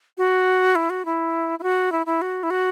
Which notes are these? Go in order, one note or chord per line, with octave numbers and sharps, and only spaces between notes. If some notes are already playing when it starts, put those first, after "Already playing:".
F#4
E4
F#4
E4
E4
F#4
E4
E4
F#4
E4
F#4